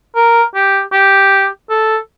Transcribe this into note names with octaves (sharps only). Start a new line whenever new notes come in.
A#4
G4
G4
A4